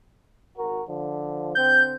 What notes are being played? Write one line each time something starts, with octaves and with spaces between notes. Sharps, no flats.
G#1 F#4 A#4
D3 F3
D3 C4 G6